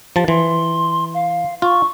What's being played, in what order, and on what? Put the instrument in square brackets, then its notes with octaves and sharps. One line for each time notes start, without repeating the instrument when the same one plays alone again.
[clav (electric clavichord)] F3 A5 [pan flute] G4
[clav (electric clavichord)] E3 [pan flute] C6
[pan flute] F5
[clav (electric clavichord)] F4 [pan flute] C#6